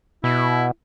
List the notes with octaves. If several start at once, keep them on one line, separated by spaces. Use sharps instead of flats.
B2 E4